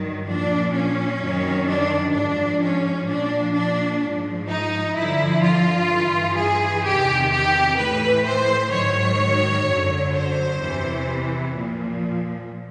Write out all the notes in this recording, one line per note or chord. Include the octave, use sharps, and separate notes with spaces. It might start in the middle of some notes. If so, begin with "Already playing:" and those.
Already playing: G2 D#3 F#3
A#2 F3 D4
C#4
F#2 D#3 F#3
D4
G#2 F3 D4
C#4
A#2 F3 D4
D4
G#2 F3
D#4
G2 D3 F3 E4
F4
G2 E3
G#4
E2 C3 D#3 G4
G4
A2 E3 B4
C5
G#2 D#3 F#3 C#5
F#2 D3 F#3
C5
E2 C3 E3
A#2 F3